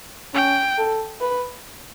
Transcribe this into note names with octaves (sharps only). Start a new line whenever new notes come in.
C#4 G5
A4
B4